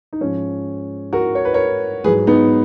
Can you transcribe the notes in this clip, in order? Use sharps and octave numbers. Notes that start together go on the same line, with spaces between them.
D#4
G#2 F3 C#4
F#4 A#4
C#5
B4
A#4 C#5
G#2 F#3 G#4 B4
B3 D#4